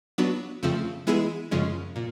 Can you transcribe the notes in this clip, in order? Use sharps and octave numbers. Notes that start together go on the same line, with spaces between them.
F#3 B3 D4 F#4
F2 C#3 F3 A3 C4
E3 G#3 B3 E4 G#4
F#2 C#3 F3 G#3 C#4
A#2